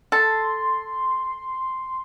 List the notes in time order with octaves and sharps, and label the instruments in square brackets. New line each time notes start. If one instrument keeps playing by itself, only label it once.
[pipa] A4 [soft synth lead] C6